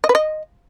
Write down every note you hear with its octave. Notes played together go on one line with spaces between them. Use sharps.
D#5
B4
D#5